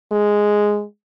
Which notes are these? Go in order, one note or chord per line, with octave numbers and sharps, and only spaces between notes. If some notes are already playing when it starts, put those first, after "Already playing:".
G#3